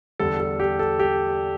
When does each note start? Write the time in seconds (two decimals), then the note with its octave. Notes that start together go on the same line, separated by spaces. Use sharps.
0.19 E2 D3 G3 A4
0.40 A4
0.60 G4
0.79 A4
0.99 G4